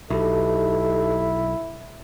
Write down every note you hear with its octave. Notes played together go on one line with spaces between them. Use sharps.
B1 D#4 E4 G4 A4